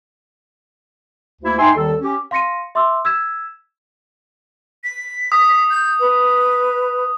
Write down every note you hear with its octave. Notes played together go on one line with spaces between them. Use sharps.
D2 A#3 E4
D#4 E5 G5 G#5 C6
D#2 D#3 G3 A4
C#4 G4
F5 C6 A#6 C#7 D#7
E5 C6 D6 E6
E6 G#6 B6 E7
B6
D#6
G6
B4